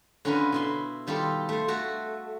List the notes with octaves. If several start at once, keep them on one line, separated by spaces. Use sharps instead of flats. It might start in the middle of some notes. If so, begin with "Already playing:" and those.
D3 C#4 E4 F4 A#4 B4
B2 E4 C6
D#3 G3 F4 G4 A4
A3 C5
A3 F#4 A4